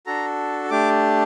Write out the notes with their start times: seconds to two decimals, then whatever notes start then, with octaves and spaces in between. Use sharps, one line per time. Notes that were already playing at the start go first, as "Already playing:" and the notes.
0.06 D4 F#4 A4 A#5
0.70 A3 D4 G4 D6